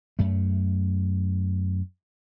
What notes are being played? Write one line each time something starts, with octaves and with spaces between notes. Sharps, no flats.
F#2 A3